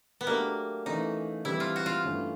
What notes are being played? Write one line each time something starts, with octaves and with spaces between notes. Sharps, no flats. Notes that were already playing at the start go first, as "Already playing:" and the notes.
B3
F#3 A3 A#3 D4 G4
E3 A3 C#4 D#4
E3 G3 C4 E4
F4
F#4
F4
G2 E3 A3 C#4